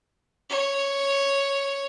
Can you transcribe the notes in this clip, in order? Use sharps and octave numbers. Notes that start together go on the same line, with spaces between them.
C#5